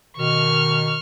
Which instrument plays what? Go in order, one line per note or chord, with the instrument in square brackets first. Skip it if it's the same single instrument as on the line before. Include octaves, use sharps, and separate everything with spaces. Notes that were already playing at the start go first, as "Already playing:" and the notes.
[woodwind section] B2 D#3 [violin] C#6 F6